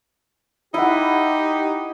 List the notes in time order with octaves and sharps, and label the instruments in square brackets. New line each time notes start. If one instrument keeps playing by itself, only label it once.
[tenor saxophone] D#4 [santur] E4 F#5 [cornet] G4